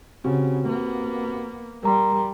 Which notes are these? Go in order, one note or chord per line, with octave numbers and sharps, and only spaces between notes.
C#3 C4 F#4 G4
A#3 B3
G3 A#4 A#5 C6